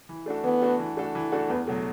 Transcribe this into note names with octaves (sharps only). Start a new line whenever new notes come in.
E3
A3 D4 F#4 A4
E3 B3
A3 D4 F#4 A4
E3
A3 D4 F#4 A4
E3
A3 D4 F#4 A4
E2 B3
B2 F#3 A3